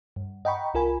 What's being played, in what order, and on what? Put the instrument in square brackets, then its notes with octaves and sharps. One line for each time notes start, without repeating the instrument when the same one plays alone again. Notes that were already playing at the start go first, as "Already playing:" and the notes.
[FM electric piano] G2
D#5 F#5 G5 A#5 B5 C#6
C2 F4 A#4 G#5 B5